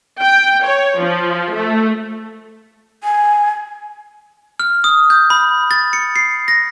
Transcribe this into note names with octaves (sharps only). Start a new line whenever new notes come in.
G5
C#5
F3
A3
G#5
F6
D#6
G6
B5
A6
C#7
C7
A#6